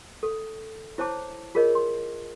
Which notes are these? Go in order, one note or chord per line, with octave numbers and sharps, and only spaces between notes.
A4
E4 C5 C#5 A5 D6
F4 G#4 A#4 C#5 D#5
C6